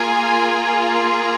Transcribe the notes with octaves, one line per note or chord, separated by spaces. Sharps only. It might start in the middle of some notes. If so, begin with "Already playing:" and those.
Already playing: A#3 F4 G#4 G#5